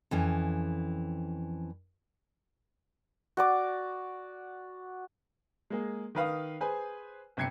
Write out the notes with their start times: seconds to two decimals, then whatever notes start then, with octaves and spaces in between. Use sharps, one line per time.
0.11 F2 E3 C#4
3.37 F#4 D5 D6
5.70 G#3 A#3 G#4
6.15 D#3 B4 F5 D#6
6.61 G#4 B4 C5 G#5
7.37 G1 C3 G5 G#6 C7 C#7